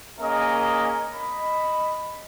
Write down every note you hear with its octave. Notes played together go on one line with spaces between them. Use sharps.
A#3 C#4 G#4 A#4 D#5
D#5 B5